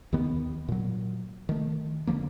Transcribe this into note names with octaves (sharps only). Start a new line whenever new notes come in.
D#2 D#3 B3
A#2 F#3
D#3 A3
F1 D3 F3 A#3